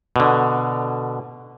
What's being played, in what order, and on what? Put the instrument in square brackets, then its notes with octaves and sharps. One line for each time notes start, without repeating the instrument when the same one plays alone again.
[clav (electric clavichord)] B2 D3